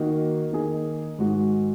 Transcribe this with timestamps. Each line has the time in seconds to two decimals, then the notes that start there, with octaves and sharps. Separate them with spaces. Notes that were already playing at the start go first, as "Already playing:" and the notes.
Already playing: D#3 A#3 D#4 F#4
0.52 D#3 A#3 D#4 G#4
1.19 G#2 D#3 G#3 D#4 F#4